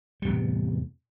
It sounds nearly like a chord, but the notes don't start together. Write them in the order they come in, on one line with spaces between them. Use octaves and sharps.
G3 E2 A2 C3